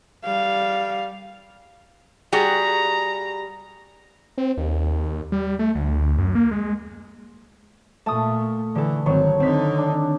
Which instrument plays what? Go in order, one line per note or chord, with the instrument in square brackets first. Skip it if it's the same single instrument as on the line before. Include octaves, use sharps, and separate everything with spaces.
[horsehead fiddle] G3 F5
[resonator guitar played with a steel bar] G3 F#4 G#4 [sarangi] A#5
[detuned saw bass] C4
D#2
G3
A3
D2
F#2
A#3
G#3
[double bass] A#2 [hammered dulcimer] A3 [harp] A5 D#6
[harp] D3 A4 [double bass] E3
[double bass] G#1 F#3 [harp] D#3 C4 [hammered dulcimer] C#5
[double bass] D3 D#4 [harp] C4 B6
[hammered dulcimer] D4